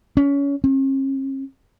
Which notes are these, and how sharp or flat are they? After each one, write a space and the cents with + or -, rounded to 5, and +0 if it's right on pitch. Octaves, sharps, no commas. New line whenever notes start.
C#4 +25
C#4 -45